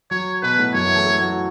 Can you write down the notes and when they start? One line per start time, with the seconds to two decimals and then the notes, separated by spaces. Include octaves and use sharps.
0.11 F#3 F#4 C#5
0.42 B2 B3 B4
0.58 A2 A3
0.74 F#2 F#3 C#5
0.85 E3 E4
0.95 A3 A4
1.06 A3 A4
1.22 F#3 F#4